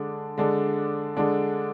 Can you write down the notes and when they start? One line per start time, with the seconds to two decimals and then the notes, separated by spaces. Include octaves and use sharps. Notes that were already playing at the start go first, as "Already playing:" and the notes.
Already playing: D3 G#3 D4
0.38 D3 G#3 D4
1.17 D3 G#3 D4